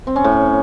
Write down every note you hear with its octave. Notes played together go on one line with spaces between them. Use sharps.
C4
C#4
A2